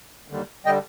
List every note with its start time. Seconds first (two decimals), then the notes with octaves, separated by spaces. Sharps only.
0.28 D#2 D3 G3
0.65 D3 G3 D#5 G5